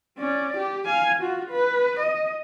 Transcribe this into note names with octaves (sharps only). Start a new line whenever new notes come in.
C#4 D5
G4
F5 G#5
F4 F#4
B4
D#5